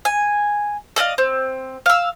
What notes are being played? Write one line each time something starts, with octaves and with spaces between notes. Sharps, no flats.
G#5
A4 D5 D#5 F5
C4
F5 E6